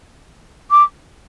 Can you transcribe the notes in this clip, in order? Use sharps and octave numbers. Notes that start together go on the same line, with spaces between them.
D6